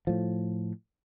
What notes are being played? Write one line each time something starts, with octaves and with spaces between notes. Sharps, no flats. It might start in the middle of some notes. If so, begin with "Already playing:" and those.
A2 F3